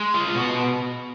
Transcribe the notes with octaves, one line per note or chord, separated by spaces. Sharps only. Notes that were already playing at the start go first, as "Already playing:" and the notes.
Already playing: G#3
F4
B2 F#4